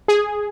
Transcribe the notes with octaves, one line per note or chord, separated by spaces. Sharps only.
G#4